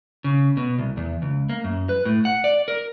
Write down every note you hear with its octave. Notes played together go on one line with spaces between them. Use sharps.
C#3
B2
C2
E2
C#2
A#3
F#2
B4
A2
F#5
D5
A#4